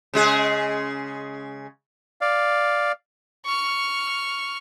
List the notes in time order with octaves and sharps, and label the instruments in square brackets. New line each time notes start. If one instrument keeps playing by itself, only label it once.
[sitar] C#3 G#3 G#4
[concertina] D5 F5
[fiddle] C#6 F6